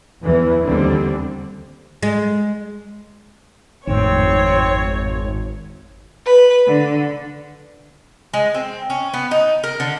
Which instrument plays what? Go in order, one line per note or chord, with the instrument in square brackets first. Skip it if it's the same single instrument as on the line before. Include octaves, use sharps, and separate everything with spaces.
[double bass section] E2 E3
D#2 D3 G3 C4
[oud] G#3
[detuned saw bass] G#1 [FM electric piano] F2 A2 D#3 [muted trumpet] C4 [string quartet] C#5
[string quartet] B4
D3
[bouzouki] G#3
C4
C#4
B3
D#4
A#4
D3